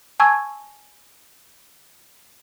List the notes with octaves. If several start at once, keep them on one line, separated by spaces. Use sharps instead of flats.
G#5 A5 C#6 E6 G#6